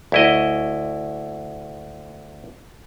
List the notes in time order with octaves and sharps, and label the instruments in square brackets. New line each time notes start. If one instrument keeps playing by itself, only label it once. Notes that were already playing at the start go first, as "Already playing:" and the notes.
[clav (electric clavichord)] D2 E4 D#5